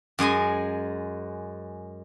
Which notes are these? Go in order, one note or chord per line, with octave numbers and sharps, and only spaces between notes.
F#2 G#3 G#4 G#5